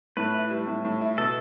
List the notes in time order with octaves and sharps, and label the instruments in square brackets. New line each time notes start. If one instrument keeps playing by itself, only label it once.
[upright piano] A2 [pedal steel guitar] B4
[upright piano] E4
G3
A2
A2
E4
[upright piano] B2 [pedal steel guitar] A4